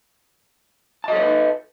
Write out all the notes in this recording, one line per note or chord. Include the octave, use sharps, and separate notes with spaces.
A4 B4 C#5 D#5 A5